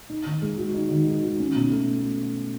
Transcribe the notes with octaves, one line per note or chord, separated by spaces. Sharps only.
D#4
D#3
G#3
F#4
D#4
D#3
G#3
F#4
C#4
B2
A3